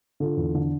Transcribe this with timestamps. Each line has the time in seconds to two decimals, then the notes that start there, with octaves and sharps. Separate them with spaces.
0.20 D3 F4 A4
0.37 E2
0.54 D3